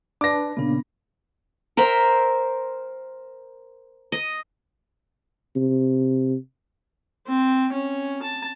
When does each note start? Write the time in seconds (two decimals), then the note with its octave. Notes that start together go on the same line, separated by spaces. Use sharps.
0.21 D4 B4 D5 A5 D6 A#6
0.57 A#2 C#3 A#3 B3 D4
1.77 A#4 C5 E5 G5
4.12 D#5
5.56 C3
7.27 C4
7.73 C#4
8.23 A5